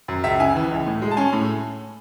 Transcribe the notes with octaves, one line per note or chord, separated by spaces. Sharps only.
F#2
C#2 E5
C#3 G#5
E3
C#2
A2
G#3
A5
C#4 G#5
A2